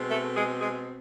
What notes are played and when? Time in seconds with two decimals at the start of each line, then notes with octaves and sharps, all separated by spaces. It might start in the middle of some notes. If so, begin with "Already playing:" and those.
Already playing: B2 G#3 C4
0.10 A3 A4
0.36 G#3 G#4
0.61 G#3 G#4